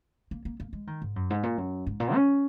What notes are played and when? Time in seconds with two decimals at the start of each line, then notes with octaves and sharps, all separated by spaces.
0.31 A#3
0.45 A#3
0.60 A#3
0.73 G#3
0.87 D#3
1.02 G#2
1.16 F#2
1.30 G#2
1.43 A#2
1.58 F#2
1.87 G#2
2.00 A#2
2.14 C#4